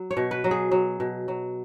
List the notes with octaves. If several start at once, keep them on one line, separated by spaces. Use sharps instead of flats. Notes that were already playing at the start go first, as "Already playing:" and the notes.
Already playing: F#3
C#5
B2
B4
F#3
G#4
F#3
B2
F#3